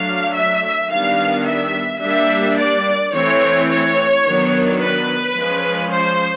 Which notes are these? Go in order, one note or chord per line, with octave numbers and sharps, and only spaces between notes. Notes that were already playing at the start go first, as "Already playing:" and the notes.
Already playing: F#3 A3 D4 F5
E5
D#3 G3 B3 D4 F5
E5
G3 A#3 D4 E5
D5
E3 A3 C4 C#5
C#5
D#3 F#3 B3 D4
B4
F3 G#3 C#4
C5